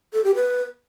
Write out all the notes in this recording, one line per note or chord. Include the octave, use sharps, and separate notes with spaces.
A4
G4
B4